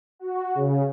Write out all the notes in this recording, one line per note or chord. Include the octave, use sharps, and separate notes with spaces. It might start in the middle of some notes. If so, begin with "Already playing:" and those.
F#4
C#3